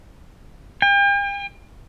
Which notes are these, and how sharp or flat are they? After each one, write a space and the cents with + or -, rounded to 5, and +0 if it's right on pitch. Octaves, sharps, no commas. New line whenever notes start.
G5 +40